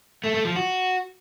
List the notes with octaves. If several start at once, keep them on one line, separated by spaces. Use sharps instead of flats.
A3
A3
F3
F#4